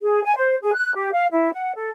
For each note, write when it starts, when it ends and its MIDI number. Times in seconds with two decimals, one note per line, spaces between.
0.02 0.22 68
0.24 0.35 80
0.37 0.56 72
0.62 0.74 68
0.75 0.92 90
0.95 1.12 67
1.13 1.26 77
1.31 1.50 64
1.53 1.75 78
1.76 1.91 69